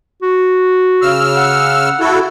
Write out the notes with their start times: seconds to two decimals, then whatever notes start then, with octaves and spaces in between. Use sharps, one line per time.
0.22 F#4
1.02 C#3 E6 F6
1.37 F#5
2.00 E4 F#4 A4